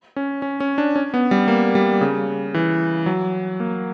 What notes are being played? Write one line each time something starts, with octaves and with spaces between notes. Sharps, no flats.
C#4
C#4
C#4
D4
C#4
B3
G3
A#3
G3
C#3
E3
F#3
A#3